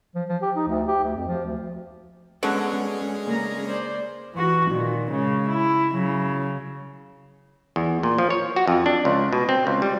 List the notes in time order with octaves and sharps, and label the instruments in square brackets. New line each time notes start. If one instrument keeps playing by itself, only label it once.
[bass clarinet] F3
F3
G4
D#4
D2
G4
D2
F2
F3
D2
[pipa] D3 F#3 [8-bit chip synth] G#3 C#4 G#4 [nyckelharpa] B3 A4
[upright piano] C#3 A#3 [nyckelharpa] D4 A#5
[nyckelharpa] C5 D5
[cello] E3 F#4
A#2 D#3
C#3 G#3
E4
C#3 F#3
[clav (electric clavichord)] E2
A#2
F3
C#5
F#4
F2
D4
C#2
B2
C4
C#2
G3